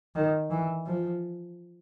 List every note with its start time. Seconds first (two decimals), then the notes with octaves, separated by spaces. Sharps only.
0.15 D#3
0.51 E3
0.86 F3